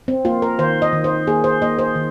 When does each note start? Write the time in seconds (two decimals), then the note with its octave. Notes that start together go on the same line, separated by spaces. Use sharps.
0.08 C4
0.25 A#3 F4
0.42 A#4
0.59 D#3 C5
0.82 D#5
0.93 D#3
1.04 C5
1.27 A#3 G#4
1.44 C5
1.62 A#3 D#5
1.79 C5
1.95 D#3